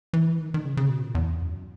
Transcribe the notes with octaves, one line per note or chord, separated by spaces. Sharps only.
E3
D#3
D#3
C#3
C#3
B2
A#2
E2
F#2